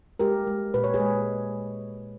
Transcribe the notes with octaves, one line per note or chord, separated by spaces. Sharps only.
G#3 G4 A#4
G#3
A#2 B4
C#5
G#4 B4
G#3